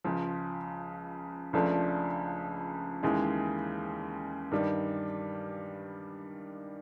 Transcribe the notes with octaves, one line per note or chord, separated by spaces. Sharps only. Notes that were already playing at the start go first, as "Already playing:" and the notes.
C#2 C#3 F3
C#2 C#3 F3 A3 D4
D#2 C#3 E3 G#3
G2 D#3 G3